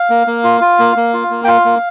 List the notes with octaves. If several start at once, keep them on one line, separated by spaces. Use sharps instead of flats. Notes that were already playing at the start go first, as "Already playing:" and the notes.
Already playing: F5
A#3
A#3
F4
F4
A#3
A#3
F4
A#3
G5
F4 F5
A#3